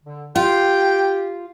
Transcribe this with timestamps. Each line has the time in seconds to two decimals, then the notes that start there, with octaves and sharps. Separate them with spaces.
0.04 D3
0.36 F4 G4 G5